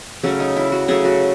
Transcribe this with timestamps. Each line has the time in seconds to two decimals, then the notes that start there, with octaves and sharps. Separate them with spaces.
0.23 C#3 F#3 A3 C#4
0.40 D#4
0.57 E4
0.72 F#4
0.88 C#3 F#3 A3 G#4
1.05 F#4